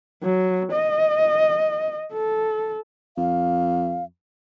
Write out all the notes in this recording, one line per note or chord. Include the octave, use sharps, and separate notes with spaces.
F#3
D#5
A4
F2 F5